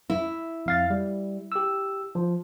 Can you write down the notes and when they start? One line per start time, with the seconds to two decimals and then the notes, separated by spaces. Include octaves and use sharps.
0.10 E4
0.66 F2 F5 A6
0.90 G3
1.52 G4 E6
2.15 F3